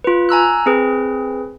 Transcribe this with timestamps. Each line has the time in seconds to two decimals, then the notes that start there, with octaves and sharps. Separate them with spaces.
0.04 F4 B4
0.29 G#5 A#5 E6 F#6
0.66 C4 G#4 B4